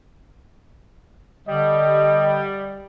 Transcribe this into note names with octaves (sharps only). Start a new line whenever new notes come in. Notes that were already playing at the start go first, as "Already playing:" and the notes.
D3 G3 D#5